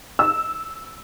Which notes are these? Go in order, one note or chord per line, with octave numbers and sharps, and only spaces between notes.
E6